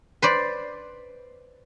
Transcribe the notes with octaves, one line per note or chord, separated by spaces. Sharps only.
B4 C5 D5